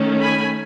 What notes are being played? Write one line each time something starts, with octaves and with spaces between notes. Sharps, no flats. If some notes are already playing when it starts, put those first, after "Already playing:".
Already playing: D#3 A3 C#4
G#5 B5